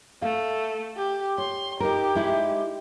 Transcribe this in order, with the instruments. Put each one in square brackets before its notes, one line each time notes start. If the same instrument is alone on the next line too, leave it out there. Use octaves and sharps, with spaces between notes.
[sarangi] A3 [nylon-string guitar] F5
[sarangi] G4
[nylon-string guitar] C#5 [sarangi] C6
[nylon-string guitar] D#4 A#4 [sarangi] G4
[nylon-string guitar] G#3 D#4 E4